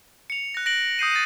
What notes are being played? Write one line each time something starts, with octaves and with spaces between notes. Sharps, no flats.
C#7 F7
F#6 A#6
A#6 D7 F#7
D#6 G6 C7 D#7
A6 D#7